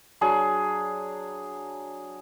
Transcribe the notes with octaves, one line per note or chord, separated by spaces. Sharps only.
F#3 D4 G#4 C6